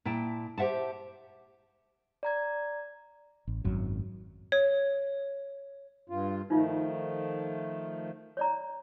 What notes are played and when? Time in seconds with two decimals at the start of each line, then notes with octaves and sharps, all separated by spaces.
0.05 A#2 E4 G5 A5
0.58 G4 C5 E5 F#5 A5
2.23 D5 A#5 G#6
3.47 A1
3.64 G#1 F#2 F#3
4.52 C#5
6.09 G2 F4
6.50 D#3 F3 A3 D#4 F4 F5
8.37 C#5 D5 A#5